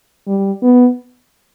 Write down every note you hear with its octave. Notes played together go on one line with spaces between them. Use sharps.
G3
B3